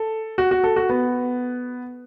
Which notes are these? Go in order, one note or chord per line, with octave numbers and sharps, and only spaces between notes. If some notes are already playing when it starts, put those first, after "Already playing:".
Already playing: A4
F#4
F#4
A4
F#4
B3